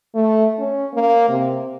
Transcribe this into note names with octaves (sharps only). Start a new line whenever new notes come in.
A3
C#4
A#3
C3